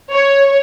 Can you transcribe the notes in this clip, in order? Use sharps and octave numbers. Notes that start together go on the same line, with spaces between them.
C#5